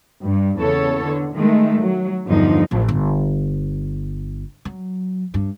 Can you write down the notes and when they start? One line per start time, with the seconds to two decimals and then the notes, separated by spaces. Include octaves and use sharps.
0.24 G2
0.59 E2 C#3 B3 A4 C#5
1.04 D3
1.34 D#3 G#3 A3
1.79 F#3
2.27 E2 G2 D3 F3 D#4
2.71 A1
2.88 G1
4.65 F#3
5.34 G2